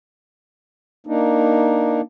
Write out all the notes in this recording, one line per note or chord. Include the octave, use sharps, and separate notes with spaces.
A#3 D4 D#4